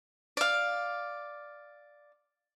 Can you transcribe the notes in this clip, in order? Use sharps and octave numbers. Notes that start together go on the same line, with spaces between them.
D5 F5